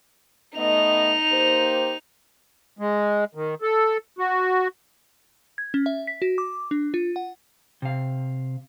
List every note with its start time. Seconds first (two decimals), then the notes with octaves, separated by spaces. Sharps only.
0.57 A3 B3 D#4 D#5 F7
1.32 A#3 G4 C5
2.79 G#3
3.35 D#3
3.62 A4
4.19 F#4
5.58 G#6
5.74 C#4
5.86 E5
6.07 B6
6.22 F#4
6.38 D6
6.71 D4
6.94 F4
7.16 F#5
7.82 C3 F5